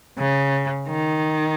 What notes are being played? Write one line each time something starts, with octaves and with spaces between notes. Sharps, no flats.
C#3
D#3